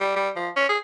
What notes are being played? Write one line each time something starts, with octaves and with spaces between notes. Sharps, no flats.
G3
G3
F3
C#4
G#4